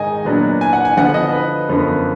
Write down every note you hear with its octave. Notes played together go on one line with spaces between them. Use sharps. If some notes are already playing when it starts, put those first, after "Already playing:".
Already playing: G#2 D#3 G#3 D#4 D#5 G#5
A#2 F#3 B3 D4
G#5
F#5
G#5
D3 F3 B3 D4 F#5
D#5
B4
F#2 D3 F3 B3